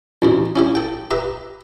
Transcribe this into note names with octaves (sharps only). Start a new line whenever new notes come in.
A1 D2 C3
C#4 E4 G4
A4 G5
G4 B4 E5 A#5